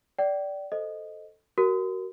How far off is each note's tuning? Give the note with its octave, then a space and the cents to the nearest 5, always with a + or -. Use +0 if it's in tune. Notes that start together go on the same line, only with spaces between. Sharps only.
D5 -15 G5 -30
A4 +0 C5 +0 D#5 +0
F#4 +25 A#4 +0